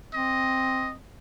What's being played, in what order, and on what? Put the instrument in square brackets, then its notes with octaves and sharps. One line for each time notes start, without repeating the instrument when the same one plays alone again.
[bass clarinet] C4 [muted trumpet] D#5